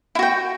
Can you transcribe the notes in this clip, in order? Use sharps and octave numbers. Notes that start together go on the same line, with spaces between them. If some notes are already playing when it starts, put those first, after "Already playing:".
E4 F#4 G5